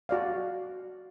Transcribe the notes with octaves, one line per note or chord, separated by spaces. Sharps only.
F#4 D5 F5